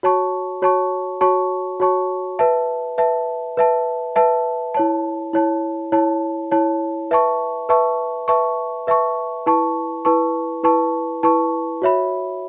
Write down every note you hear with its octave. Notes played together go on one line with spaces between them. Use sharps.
F#4 C#5 A5 C#6
F#4 C#5 A5 C#6
F#4 C#5 A5 C#6
F#4 C#5 A5 C#6
B4 E5 A5
B4 E5 A5
B4 E5 A5
B4 E5 A5
E4 C#5 A5
E4 C#5 A5
E4 C#5 A5
E4 C#5 A5
B4 E5 A5 C#6
B4 E5 A5 C#6
B4 E5 A5 C#6
B4 E5 A5 C#6
E4 B4 A5 C#6
E4 B4 A5 C#6
E4 B4 A5 C#6
E4 B4 A5 C#6
F#4 C#5 E5 B5